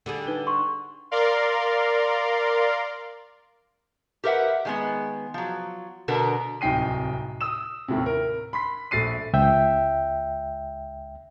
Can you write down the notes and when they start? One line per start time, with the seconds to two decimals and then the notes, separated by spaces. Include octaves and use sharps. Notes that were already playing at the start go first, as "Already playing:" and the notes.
0.06 D3 G3 G#4
0.27 D#4 B4 G7
0.47 C6 C#6
1.11 A#4 D5 F5 C6
4.24 G4 A#4 B4 E5 F#5
4.65 D#3 G#3 B3
5.34 F3 F#3
6.08 B2 D3 B3 A4 A#4
6.61 D1 C2 D#4 G5 C7 D#7
7.41 D#6 E6 E7
7.88 D#2 A2 C3
8.06 A#4
8.53 B5 C6 B6
8.91 A#1 A3 A6 C7 D#7
9.33 C#2 E5 G5